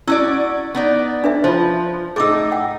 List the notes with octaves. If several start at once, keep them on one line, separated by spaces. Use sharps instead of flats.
C#4 E4 F#4 D5 E6
B3 D#4 D5
D4 B4 E5
F3 F4 C5
A2 D#4 G#4 D6 E6
F#5 G5